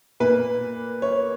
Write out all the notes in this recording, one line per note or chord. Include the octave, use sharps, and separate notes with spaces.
A#2 A#3 B4
C#5